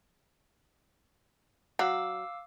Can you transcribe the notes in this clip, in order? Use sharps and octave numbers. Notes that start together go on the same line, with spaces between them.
F#3 F5 D6 E6